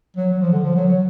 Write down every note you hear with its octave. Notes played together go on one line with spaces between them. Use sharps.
F#3
F#3
F3
D3
F3
F#3
F#3